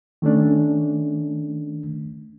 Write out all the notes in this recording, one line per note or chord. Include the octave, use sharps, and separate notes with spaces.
D#3 A3 C#4 D4